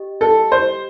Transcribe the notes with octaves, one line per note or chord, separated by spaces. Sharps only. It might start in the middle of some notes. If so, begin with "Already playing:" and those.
Already playing: G4 D#5
A4
C5